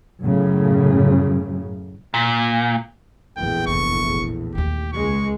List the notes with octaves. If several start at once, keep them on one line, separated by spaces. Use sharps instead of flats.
F#2 A2 C#3
A#2
A#1 E2 A2 G5
F1 C#6
D#2 A3 G4
C#2 G#3 C#6